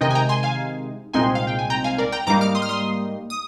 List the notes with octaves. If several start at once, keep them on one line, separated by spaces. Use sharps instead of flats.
C3 D#3 G#3 D#4 D#5 G5
G#5
G5 A#5
G#5 C6
F5 G#5
C2 A#2 G#3 C4 D#4 G#5 C6
F5
G5
G#5
G5 A#5
F5 G#5
A#4 D5
G5 A#5
G#2 G3 A#3 D#4 A#5 D6
D6 F6
C6 D#6
F6
C6 D#6
D#6